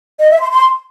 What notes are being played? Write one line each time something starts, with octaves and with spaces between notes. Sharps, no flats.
D#5
E5
C6
C6